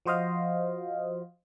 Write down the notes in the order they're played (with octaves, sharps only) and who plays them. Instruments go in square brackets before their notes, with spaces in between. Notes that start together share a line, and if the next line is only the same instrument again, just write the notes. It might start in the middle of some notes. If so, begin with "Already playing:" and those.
[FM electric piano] F3 F#4 C5 D#5 F5